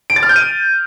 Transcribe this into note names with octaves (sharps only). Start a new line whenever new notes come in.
D7
A6
F6
G6
D#7